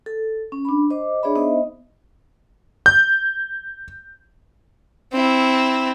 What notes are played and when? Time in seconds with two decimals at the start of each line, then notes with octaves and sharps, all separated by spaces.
0.06 A4
0.52 C#4
0.65 D4 B5
0.90 C5 D#5 D6
1.23 D4 G#4 C#5 D5 E5 B5
1.36 B3 D#4 C5 D#5 E5
2.86 G6
5.12 C4 E4